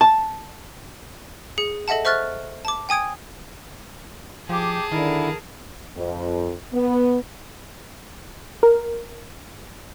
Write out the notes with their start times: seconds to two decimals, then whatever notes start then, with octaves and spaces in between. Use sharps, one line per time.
0.01 A5
1.58 G#4 C#7
1.88 A4 D#5 E5 F#5 A5
2.05 C5 E5 C#6 F6 F#6 A6
2.65 A5 D6
2.89 G5 G#5 D#6 G#6 D7
4.49 F3 G4 G#4 A5 D6
4.92 D3 D#3 E4 A#4
5.97 F2
6.73 B3
8.63 A#4